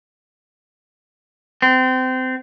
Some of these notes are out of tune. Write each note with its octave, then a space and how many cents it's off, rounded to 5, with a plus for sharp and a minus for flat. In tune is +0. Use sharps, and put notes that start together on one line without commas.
C4 -25